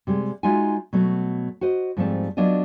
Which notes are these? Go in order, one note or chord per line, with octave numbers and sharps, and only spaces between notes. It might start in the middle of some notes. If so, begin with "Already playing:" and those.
C3 G3 G#3
G#3 D#4 F4 F#4 E5 G#5
B2 F#3 A3
F#4 C5 D#5
G#2 F3 G3 A3 C4 A5
F#3 B3 D4 F4 D#5